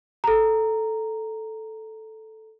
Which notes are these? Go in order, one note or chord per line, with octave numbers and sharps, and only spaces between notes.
A4 A#5